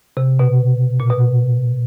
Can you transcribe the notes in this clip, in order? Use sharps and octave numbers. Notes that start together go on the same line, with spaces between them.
C3
B2
A#2
B2